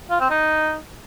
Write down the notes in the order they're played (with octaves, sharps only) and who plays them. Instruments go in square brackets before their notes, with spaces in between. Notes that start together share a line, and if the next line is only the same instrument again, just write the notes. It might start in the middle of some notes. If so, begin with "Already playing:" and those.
[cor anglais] F4
C4
D#4